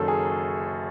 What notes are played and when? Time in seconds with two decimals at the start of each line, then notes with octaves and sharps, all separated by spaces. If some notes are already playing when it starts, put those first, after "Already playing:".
Already playing: F#1 F#2 D#3 F#3 A4 C#5
0.08 G#4